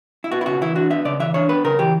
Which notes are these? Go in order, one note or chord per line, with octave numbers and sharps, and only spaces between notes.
E4
B3 F#4
E4
C#3 F#4
E3 E4
D4 F#4
B3 E5
C#3 D5
E3 E5
D4 C#5
B3 B4
C#3 A#4
E3 G4